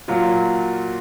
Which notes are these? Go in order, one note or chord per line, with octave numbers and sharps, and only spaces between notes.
A#2 F#3 F4